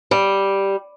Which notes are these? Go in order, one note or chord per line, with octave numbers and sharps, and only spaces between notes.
G3